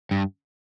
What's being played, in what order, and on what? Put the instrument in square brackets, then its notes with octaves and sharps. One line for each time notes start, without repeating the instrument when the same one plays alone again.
[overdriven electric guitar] G2